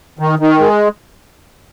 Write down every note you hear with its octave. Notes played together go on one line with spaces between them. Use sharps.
D#3
D#3
G#3